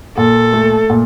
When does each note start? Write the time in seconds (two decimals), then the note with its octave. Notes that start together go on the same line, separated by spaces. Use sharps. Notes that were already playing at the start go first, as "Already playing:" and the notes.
0.17 A#2 A4
0.53 A3
0.90 A#2